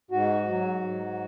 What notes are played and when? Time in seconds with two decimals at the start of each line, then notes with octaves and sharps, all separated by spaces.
0.11 G#2 F#4
0.48 F#3
0.82 G#2